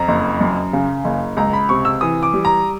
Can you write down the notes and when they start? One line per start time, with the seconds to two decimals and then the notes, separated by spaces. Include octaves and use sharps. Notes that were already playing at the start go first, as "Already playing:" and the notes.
Already playing: F2 A#5
0.08 F#1
0.41 F#2
0.73 C#3
1.05 F#1
1.37 C#2 A#5
1.53 B5
1.69 C3 C#6
1.85 E6
2.01 E3 D#6
2.23 D6
2.33 G3
2.45 A#5